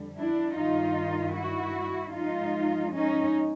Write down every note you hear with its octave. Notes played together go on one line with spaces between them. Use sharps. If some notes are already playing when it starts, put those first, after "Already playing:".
Already playing: F2 D3 G3
D4 E4
G2 D#3 G3 D#4 F4
E4 F#4
G#2 F3 G#3 D#4 F4
C#4 D#4